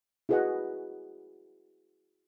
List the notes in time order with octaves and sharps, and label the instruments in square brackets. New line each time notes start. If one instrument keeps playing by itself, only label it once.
[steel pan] E4 F#4 G#4 B4 D#5 F#5